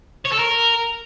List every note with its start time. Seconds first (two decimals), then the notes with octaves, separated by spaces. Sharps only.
0.25 C#5
0.32 A4
0.39 A#4